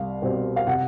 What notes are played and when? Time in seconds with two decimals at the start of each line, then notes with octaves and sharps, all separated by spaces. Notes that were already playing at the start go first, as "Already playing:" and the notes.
Already playing: C2 F5
0.22 B2 G3 C4
0.56 F5
0.67 C3 F#5